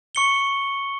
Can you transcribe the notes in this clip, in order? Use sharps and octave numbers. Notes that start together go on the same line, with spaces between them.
C#6 C#7 G7